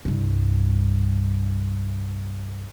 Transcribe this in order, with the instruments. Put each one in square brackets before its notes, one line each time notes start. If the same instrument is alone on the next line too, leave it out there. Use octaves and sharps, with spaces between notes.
[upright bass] C2 G2